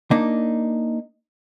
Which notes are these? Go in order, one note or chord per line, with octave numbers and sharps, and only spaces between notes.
A#3 D4 D#4